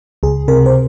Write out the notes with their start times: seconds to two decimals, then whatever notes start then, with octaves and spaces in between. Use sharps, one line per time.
0.23 C#2 G#4
0.48 C3 A#4
0.66 C5